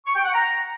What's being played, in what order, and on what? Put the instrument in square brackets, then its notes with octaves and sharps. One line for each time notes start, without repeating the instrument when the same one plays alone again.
[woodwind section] C#6
G5
F#5
A#5